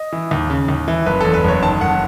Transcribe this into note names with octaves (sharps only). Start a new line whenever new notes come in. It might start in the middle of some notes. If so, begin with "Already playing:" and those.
Already playing: D#5
E3
D#2
C#3
D#2
E3
F#1 B4
E2 A4
B4
F#1 C#5
D#3 A5
F#1 F#5